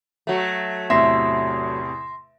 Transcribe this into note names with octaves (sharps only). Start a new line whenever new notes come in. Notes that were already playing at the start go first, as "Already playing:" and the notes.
F#3 A3
E2 A2 C3 E5 C6 A#6 C7